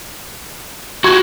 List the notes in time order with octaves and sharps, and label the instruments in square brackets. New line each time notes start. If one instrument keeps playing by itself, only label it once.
[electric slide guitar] F#4 G4 [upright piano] C#6 G#6